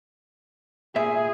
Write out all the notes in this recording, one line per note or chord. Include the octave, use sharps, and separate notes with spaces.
A#2 G#4 E5